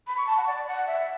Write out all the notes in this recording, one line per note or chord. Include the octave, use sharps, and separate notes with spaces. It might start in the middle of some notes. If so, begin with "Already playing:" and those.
B5
C#6
A5
F#5
D5
F#5
E5